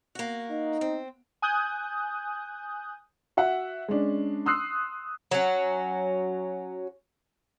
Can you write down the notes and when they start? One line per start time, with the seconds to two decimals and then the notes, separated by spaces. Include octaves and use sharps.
0.15 A#3 F#4
0.50 D#4
0.81 C4
1.42 G#5 D#6 F#6 G6
3.37 F#4 E5 F#5
3.88 G#3 C#4 D4
4.46 C6 D#6 E6 F#6 C7
5.31 F#3 C#4